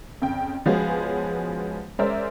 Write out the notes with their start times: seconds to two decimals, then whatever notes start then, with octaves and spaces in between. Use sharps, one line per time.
0.22 F2 C#3 G5
0.66 F3 G#3 B3 C#4 F#4 G#4
1.99 G#3 C#4 A#4 C5 D5 E5